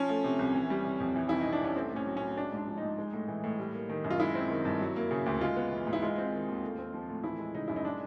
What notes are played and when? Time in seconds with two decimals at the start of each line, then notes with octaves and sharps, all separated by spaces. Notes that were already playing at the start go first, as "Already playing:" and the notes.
Already playing: F3 C#4
0.09 A3
0.24 C3
0.39 C2
0.54 E3
0.70 G3
0.85 C3
1.00 F2
1.16 E3
1.29 C2 E4
1.41 C3 D#4
1.53 D4
1.61 C2 C#4
1.76 A3 C4
1.91 A2 C#4
2.07 F#3
2.17 A2 C#4
2.37 G#3 D4
2.53 G#2 D4
2.67 F3
2.78 G#2 D#4
2.98 G#3
3.13 A2
3.28 E3
3.44 A2
3.59 G3
3.74 A#3
3.89 D#3
4.04 F#2
4.10 F4
4.20 G#3 E4
4.35 C4
4.50 D#3
4.65 G2
4.80 F#3
4.96 A#3
5.11 C#3
5.26 D2
5.41 G#3 F4
5.56 B3
5.72 E3
5.87 G#2
5.93 E4
6.02 G#3 F4
6.18 C4
6.33 D#3
6.48 D#2
6.63 A3
6.78 C4
6.94 F3
7.09 A2
7.24 E3 E4
7.39 G#3
7.54 C#3 D#4
7.68 F#2 E4
7.76 D#4
7.85 G#3 D4